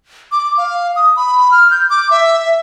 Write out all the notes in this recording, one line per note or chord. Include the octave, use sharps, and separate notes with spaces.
D6
F5
D#6
B5
F6
G6
D6
E5